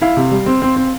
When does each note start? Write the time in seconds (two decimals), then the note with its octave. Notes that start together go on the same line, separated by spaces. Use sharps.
0.02 E4 F5
0.17 C3
0.31 G3
0.46 C4
0.62 C4
0.76 C4